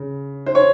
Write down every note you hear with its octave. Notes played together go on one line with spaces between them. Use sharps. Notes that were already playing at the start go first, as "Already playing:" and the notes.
Already playing: C#3
C5
C#5